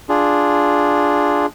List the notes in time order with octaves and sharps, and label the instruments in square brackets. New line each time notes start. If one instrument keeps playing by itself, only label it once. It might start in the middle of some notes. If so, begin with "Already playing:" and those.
[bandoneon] D4 F4 G#4